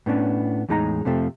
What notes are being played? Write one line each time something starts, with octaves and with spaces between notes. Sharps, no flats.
A2 B3 C#4 D4
E2 A2 G#3 D#4 A5 A#5
F2 C3 F3 A3